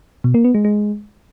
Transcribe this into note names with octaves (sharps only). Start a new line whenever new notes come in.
B2
A#3
B3
G#3
G#3